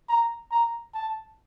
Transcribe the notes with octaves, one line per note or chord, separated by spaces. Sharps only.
A#5
A#5
A5